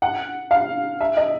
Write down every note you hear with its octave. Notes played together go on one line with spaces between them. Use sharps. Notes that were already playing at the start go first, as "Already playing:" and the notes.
F#5
F5
E5
D#5